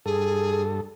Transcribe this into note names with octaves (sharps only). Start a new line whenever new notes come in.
G2 G#4 A4